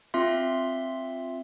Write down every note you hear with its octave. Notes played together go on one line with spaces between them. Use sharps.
C4 F4 E5 C6